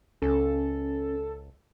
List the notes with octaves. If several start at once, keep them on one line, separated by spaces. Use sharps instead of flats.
C#2 C#4 A4